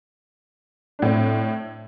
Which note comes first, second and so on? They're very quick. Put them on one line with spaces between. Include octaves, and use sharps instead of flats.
D4 A2 C4